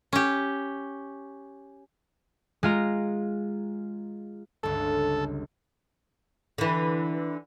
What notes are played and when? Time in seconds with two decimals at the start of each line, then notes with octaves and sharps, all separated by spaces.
0.13 C#4 G4
2.63 G#3 F4 A#5
4.63 G1 C#2 A4
6.58 D3 E3